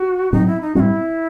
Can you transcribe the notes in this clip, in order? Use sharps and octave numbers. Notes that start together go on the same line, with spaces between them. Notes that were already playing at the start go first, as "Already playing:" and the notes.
Already playing: F#4
A2 F#3 C4 D#4
E4
D#4
A2 G3 C4 E4 F#4